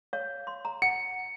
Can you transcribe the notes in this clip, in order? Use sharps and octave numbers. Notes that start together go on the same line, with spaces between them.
C#5 F5
C6
A#5
F#5 C#7